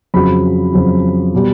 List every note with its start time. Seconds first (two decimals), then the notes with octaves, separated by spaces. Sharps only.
0.14 F2 C#3 F#3 B5
0.73 F2 C#3 F#3
1.34 B2 G3